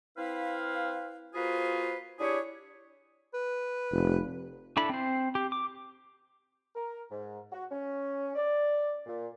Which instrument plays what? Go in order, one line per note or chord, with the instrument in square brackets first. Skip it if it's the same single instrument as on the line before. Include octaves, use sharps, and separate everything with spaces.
[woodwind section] C4 E4 B4 F5
A#3 F4 F#4 G#4 B4 C5
D4 E4 G4 G#4 C#5
[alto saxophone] B4
[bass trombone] F1
[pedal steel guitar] D4 E4 A4 B5
C4 C5
G4
D6
[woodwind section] A#4
G#2
F#4
C#4
D5
A#2